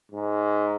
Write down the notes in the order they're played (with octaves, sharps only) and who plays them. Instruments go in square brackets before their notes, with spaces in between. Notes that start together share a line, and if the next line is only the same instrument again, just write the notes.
[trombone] G#2